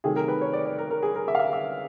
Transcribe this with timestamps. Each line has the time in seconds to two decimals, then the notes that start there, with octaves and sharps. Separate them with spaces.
0.04 C3 D#3 F#3 A3 G#4
0.16 A#4
0.28 B4
0.41 C#5
0.53 D5
0.66 D5
0.79 A#4
0.91 A#4
1.03 G#4
1.16 A#4
1.28 E5
1.35 F5
1.39 E5
1.53 E5